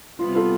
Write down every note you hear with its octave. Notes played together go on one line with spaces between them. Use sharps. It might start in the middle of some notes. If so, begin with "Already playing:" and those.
C3 G3 B3 F4
F4 A4